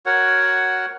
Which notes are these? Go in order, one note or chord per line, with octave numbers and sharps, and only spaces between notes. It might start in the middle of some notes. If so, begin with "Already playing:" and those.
F#4 A#4 C#5 F#5